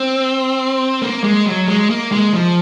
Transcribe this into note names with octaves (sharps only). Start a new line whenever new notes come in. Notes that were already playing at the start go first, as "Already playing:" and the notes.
Already playing: C4
A#3
G#3
F#3
G#3
A#3
G#3
F3